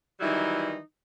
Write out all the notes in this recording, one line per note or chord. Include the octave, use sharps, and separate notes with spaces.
D#3 E3 F#3 G3 D#4 E4